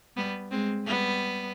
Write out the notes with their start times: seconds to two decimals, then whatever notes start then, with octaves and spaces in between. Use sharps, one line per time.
0.17 G3 B3
0.51 G#3 C4
0.86 G3 B3